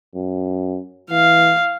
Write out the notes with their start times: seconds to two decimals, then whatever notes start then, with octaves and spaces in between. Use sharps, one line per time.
0.15 F#2
1.10 E3 F5